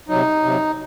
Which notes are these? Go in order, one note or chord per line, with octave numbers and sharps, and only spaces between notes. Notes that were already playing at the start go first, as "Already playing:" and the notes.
C3 F#3 D#4
C3 F#3